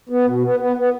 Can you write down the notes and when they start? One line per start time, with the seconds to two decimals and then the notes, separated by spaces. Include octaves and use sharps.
0.09 B3
0.26 B2
0.43 B3
0.60 B3
0.76 B3